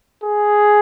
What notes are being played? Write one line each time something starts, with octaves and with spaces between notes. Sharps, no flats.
G#4